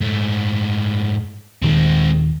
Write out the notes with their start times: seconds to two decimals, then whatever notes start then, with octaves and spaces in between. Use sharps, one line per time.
0.01 G#2 A3
1.62 D#1 D#3 G#3 C4